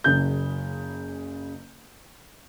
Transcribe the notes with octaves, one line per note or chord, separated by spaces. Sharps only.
F#1 C#3 G6